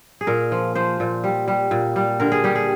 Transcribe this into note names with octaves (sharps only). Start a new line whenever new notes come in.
G#4
A#2 A#4
F3
F3 C5
A#2
G3
G3
A#2
G3
D3 A#4
G#4
G3 G4
G#4